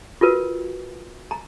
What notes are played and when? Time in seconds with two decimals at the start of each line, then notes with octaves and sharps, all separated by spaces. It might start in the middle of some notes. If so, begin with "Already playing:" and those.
0.21 F4 F#4 A#4 B4
1.31 A#5